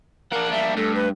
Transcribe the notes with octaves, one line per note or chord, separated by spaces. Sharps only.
A#3 D4 A#4 F#5
G3 E5
G2 A3 A4
B4